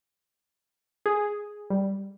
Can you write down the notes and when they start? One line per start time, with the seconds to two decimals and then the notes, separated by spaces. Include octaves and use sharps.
1.06 G#4
1.70 G3